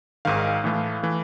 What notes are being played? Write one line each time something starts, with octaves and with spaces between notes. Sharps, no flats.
G#1 G#2 D#3 F5
A2 E3 A3
E3 A3